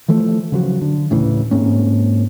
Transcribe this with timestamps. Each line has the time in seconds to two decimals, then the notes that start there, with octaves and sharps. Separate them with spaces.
0.08 E3 F3 A3
0.52 C#3 F3 F#3
0.82 D3
1.10 D1 A2 C#3 E3
1.51 G#2 A#3 C4 C#4